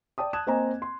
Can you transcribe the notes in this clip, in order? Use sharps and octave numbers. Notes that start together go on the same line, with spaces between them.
D5 G5 A5 D#6
A5 D#6 F#6 G#6 E7
A#3 C4 C5 D#5 G#5 A#5
C6